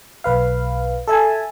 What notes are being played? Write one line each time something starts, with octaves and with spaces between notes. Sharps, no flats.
B1 B4 F5
A4 E5 G#5 A5